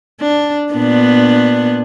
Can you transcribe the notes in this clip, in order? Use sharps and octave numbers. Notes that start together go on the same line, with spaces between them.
D4
A#2 B3 D4